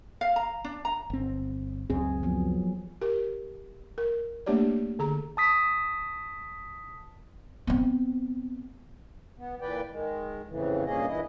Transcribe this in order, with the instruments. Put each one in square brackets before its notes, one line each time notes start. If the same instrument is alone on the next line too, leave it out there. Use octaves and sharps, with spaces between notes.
[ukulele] F5
A#5
D4
A#5
[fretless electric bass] G1 C4
[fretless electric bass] C#2 F#2 C4 [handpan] G#4
[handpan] F3 F#3 B3
[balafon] G4 A#4
A#4
A3 A#3 D4 G4 C#5 D5
D3 G#4 A#5
[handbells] A5 D#6 B6
[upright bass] B3 C4
[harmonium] B3
A#2 E3 B4 D5 G5
D#3 G#3
F2 A2 C#3 E3
G2 A#2 A#3 C#4 G#4 D#5
G2 A#2 E3 E4 D#5